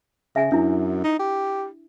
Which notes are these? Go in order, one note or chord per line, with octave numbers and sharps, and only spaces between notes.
C#3 E5 G#5
F#2 D4 E4
D#4
G4